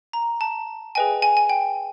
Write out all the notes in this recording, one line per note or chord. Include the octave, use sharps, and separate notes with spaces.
A#5
A5
G#4 B4 D#5 G5 G#5
G#5
G#5
G5